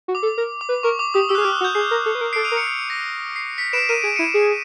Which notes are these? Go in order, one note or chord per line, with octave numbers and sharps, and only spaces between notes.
F#4
D6
A4
A#4
D6
B4
A#4 C#6
D6
G4 D#6
G4 E6
F#6
G#4
F6
G4
F#6
F#4
G6
G#4 C7
A#4
A4
B4
A#4
A4 C7 D7
D#7 F7
A#4
C#7
C7
A#6
C7
B6 C#7
B4 D7 E7
A#4 D#7
G#4 D7
E4 C#7 D#7
G#4